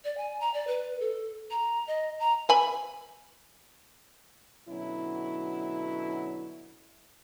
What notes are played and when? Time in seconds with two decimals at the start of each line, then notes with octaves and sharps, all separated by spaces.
0.05 D5
0.17 G#5
0.40 A#5
0.54 D5
0.67 B4
1.00 A4
1.51 A#5
1.87 D#5
2.20 A#5
2.49 B4 G#5 B5
4.69 B2 D3 F#3 C#4 E4